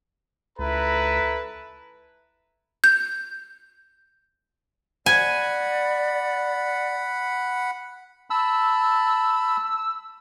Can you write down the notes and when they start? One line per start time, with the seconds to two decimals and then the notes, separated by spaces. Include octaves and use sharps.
0.59 C#2 E4 A4 B4 A#5
2.84 G6
5.06 D5 F#5 G#5 B5
8.30 A5 B5 E6